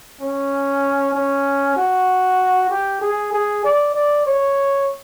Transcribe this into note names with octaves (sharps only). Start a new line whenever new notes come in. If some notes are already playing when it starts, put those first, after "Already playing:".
C#4
C#4
F#4
G4
G#4
G#4
D5
D5
C#5